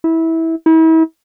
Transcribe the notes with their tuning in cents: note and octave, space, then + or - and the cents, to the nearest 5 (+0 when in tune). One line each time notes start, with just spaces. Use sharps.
E4 -20
E4 -40